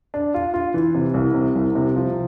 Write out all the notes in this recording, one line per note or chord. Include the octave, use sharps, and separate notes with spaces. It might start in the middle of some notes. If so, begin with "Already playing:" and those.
D4
F4
F4
E3
C3
C2
C3
C2
C3
F3